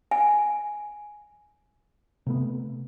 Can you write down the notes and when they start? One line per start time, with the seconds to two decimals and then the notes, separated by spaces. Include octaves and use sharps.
0.11 G#5
2.27 C3 A3 B3